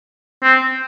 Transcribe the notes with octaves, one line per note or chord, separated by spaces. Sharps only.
C4